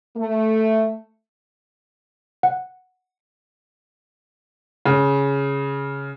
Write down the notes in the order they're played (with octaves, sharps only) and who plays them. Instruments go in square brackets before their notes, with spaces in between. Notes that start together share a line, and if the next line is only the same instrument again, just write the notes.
[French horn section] A3
[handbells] F#5
[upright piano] C#3